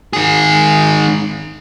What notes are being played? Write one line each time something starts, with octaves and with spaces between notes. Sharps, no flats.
D#3 G#4